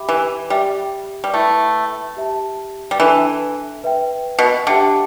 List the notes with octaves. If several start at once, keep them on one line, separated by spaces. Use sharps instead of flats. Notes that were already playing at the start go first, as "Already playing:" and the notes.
Already playing: G4 E5 G5 B5 D6
E3
G3 G4 E5 G5
G3
A3 E4 B4 E5 G5 B5
G4 E5 A5
G3
E3 D4 A4 E5 A5
B4 E5 G5
B2
D3 G4 E5 G5 D6